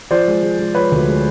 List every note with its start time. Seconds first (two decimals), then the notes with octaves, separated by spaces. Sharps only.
0.11 F3 C5 D5
0.28 G#3
0.43 G#3
0.59 G#3
0.75 F3 B4 C#5
0.92 D2
1.07 G#3